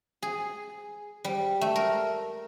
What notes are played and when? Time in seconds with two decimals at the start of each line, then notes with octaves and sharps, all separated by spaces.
0.23 G#4
1.24 G3
1.61 A3
1.76 A#4